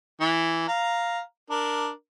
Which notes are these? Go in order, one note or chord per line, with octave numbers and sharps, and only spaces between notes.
E3
F5 A#5
D4 A#4